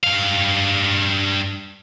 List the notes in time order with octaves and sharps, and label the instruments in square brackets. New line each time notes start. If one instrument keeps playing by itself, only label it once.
[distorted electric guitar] G2 F5